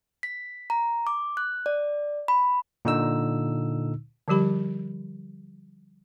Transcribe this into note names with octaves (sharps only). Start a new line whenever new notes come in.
B6
A#5
D6
F#6
D5
B5
A#2 D3 D#4 E6
D3 F3 G3 G4 B5